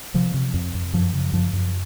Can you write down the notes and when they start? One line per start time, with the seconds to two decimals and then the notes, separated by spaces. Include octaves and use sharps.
0.14 C3 F3
0.34 C3
0.54 F2
0.74 F2
0.93 F#2 F3
1.14 C#3
1.33 F#2 F3
1.53 F#2